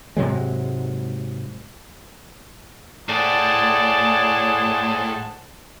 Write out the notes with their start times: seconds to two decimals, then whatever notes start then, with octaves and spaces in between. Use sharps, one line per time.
0.17 G#2 C3 F#3 G#3
3.09 A2 G#4 C5 D5 F#5 A5